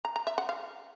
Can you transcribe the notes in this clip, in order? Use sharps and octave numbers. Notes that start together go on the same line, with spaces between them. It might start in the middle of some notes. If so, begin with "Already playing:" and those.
A#5
A#5
E5
F#5
F5